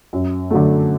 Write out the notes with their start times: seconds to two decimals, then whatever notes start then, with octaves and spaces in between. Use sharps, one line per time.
0.13 F#2
0.51 D3 F#3 A3